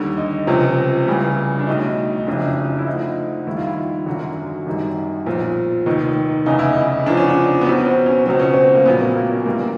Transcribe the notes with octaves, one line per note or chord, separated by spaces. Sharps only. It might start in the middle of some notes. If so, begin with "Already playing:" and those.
Already playing: D#2 D3 G3
D#4
C#2 C3 F3 C#4
C#2 C#3 E3 G3
D4
B1 A2 F#3 D#4
D#4
F#1 F2 C#3 F#3 D4
E4
D2 D3 F3 D#4
D#2 D#3 G3 E4
F4
E4
G#1 F#2 D3 F#3 F#4
G#1 F#2 D#3 G3
B1 A#2 F3
F1 D#2 D#3
F1 E2 C#3 E3 D#4
E4
D#4
E2 C#3 F3 D4
C#4
D4
B3
B1 B2 F#3 C4
C4
C#4
C#2 B2 F#3 C4
C#4
C4
A#3
A#1 A#2 F#3 B3
A#3
A#3
C#4
G1 G2 E3 G3 A#3